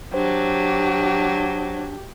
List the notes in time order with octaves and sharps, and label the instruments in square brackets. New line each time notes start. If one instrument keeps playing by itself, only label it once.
[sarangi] F#3 [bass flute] D4 [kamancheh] G4 [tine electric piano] C5